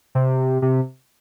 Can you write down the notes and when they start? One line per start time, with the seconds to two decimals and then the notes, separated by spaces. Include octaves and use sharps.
0.15 C3
0.62 C3